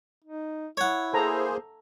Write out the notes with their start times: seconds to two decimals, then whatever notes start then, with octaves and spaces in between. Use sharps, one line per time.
0.24 D#4
0.77 E4 C#5 F#5
1.13 A#3 G#4 A4 C5 A#5